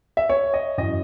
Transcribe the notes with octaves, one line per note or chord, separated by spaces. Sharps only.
E5
C#5
D#5
F#2 E3 D#5